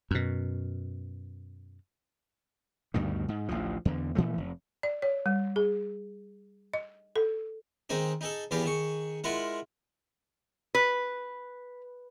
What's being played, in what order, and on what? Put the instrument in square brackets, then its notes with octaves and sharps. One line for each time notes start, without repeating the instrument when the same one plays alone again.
[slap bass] F#2 B2
D2 G2 B2 D#3
G#2
A1 D2 F3
E2 D3
A#2 E3 F3 A3
F1
[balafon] D5
C#5
G3
G#4
D#5
A4
[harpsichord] D#3 G#3 C4 D#4 G#4
D#4 G#4 A4
E2 B3 G4 G#4 F5 A#5
D#3 G#4 C#6
G#3 E4 F4 A#4 F#5
[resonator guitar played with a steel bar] B4